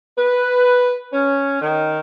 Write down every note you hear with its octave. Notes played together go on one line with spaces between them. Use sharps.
B4
C#4
D#3